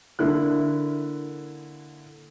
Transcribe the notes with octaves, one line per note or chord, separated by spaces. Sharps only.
D3 A#3 E4 F#6